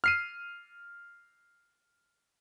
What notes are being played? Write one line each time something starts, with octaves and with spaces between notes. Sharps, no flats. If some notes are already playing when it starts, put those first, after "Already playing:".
F6 C7 D#7